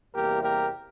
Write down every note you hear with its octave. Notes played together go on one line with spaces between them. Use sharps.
E2 C3 G3 A#3 G4 A#4
G4 A#4